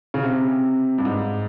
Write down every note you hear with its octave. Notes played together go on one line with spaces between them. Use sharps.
C#3
C3
G2
G#2